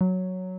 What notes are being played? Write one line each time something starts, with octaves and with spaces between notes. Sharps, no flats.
F#3